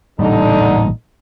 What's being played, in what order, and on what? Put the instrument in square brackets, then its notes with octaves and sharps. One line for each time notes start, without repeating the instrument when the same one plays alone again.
[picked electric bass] A1 A#2 G3 [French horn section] D3 D#4